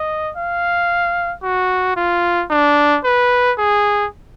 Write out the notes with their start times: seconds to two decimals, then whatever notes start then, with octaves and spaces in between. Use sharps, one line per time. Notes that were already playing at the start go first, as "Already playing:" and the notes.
Already playing: D#5
0.37 F5
1.43 F#4
1.96 F4
2.51 D4
3.04 B4
3.58 G#4